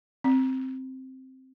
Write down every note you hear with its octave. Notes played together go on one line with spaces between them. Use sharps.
C4